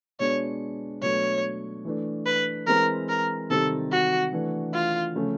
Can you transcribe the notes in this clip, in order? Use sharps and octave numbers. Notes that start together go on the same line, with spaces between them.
B2 G#3 B3 D4 C#5
B2 F#3 A3 D4 C#5
E3 A3 D4
B4
E3 G#3 C4 E4 A#4
A#4
C3 D#3 G3 C4 A4
F#4
E3 A3 D4
F4
C#3 F3 A3 C#4